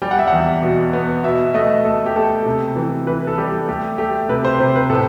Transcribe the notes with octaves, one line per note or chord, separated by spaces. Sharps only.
G3 G5
F#5
E5
E2 F#5
B2
B3
B2 E5
A3 D#5
A3 A4
G4
A3 A4
C3
E3
E3 B4
A4
G3 G4
A3 G4
A3 G4
C3 B4
C5
C3 C5
B4
A2 A4